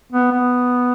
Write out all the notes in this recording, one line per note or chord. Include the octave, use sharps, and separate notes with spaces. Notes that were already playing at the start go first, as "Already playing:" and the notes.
B3
B3